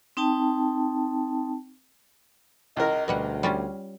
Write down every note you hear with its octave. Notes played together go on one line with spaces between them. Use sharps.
C4 D#4 G5 A5
C#2 A#4 D#5
D2 B2 G3 F#5
G3 C#4 F4